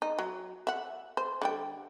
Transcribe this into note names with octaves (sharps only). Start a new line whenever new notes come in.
D#4
F#3
E5 F#5
C5
D3 G3 G5